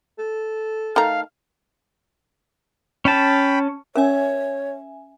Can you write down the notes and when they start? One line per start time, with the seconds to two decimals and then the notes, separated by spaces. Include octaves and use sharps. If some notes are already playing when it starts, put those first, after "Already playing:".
0.19 A4
0.96 D#3 A3 F5 A#5
3.05 C#4 G5 A5 B5
3.96 C#4 A#4 C#5 E5 G#5